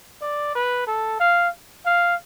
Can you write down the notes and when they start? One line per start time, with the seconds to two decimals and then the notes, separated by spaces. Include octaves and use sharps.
0.21 D5
0.55 B4
0.87 A4
1.20 F5
1.86 F5